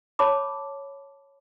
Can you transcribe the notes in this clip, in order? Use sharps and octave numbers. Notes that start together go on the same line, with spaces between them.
C#5 A5 B5 D6